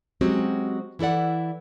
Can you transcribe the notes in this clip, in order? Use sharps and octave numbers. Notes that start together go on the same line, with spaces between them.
F#3 G#3 C4 C#4 F#4 G4
E3 E4 A4 D5 F#5